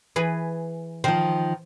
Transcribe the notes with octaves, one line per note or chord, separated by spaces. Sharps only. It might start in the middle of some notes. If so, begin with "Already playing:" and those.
E3 G#4 B4
D#3 F3 C5